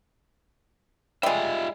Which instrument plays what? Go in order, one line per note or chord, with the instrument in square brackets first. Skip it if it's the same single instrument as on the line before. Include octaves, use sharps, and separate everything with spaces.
[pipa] G3 G#3 [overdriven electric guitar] F4 E5